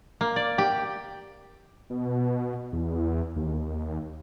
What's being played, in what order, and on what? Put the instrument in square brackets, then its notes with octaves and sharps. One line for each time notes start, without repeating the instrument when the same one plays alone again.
[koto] A#3
D5
G4
[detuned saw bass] B2
E2
D#2